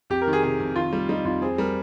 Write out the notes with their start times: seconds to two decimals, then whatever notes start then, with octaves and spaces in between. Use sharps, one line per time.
0.10 F2 G4
0.21 A#4
0.27 D#3
0.33 G#4
0.43 C3 G#4
0.60 F2
0.76 D#3 F4
0.93 G3
1.09 G3 D#4
1.25 F2 F4
1.42 C4 G#4
1.58 G3 A#4